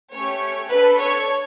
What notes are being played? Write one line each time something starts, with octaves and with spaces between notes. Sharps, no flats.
A3 C#4 G4 C#5
D4 A4 B4
C#5